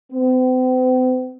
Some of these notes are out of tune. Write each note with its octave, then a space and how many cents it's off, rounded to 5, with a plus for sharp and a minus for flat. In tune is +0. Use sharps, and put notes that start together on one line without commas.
C4 -45